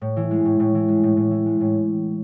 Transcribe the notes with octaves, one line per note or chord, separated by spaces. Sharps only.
A2
E3
G#3
A2
A2
E3
G#3
A2
A2
E3
G#3
A2